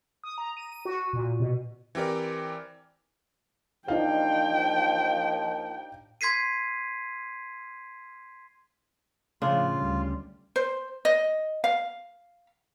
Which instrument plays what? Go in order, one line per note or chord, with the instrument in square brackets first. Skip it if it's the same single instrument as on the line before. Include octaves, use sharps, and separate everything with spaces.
[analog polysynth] D#6
A#5
D#7
D#7
F#4
A#2
B2
[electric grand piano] E3 C4 G4 A#4 D5
[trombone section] D#2 F3 [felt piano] D4 D#4 F5 [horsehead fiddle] G5
[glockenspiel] C6 G#6 B6 C7 D#7
[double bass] A2 F3 [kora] C#3 D4 [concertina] F4
[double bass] D2 G3
[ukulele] C5
D#5
F5